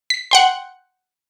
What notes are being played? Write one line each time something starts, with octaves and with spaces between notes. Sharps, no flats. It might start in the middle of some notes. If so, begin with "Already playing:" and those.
B6
F#5 G5 C6